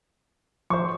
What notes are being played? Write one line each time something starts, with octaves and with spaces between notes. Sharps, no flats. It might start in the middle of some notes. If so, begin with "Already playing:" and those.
F3 C5 B5 C#6